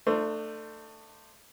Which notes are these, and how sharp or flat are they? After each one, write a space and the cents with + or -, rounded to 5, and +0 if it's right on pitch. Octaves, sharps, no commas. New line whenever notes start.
A3 +20 D4 +40 C5 +0